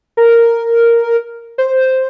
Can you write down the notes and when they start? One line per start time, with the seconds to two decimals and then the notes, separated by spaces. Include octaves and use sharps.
0.17 A#4
1.58 C5